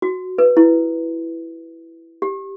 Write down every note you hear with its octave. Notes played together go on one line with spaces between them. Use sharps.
F#4
B4
E4
G4